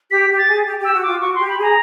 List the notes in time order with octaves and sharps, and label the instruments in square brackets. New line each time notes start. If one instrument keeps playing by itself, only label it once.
[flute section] G4 [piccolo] B6
[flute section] G4
[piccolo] A6
[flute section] G#4
G4
G4
[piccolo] E6
[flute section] F#4
[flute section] F4 [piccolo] D6
[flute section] F#4 [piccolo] C#6
[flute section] G4 [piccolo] C6
[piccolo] B5
[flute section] G#4 [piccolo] A#5